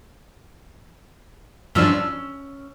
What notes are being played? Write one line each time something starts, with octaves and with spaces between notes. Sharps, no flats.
G2 F3 C#4 D4 E6